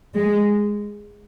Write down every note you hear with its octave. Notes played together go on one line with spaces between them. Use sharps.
G#3